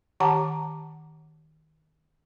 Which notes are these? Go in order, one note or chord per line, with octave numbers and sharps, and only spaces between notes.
D#3 G4 F#5 A5 A#5 D6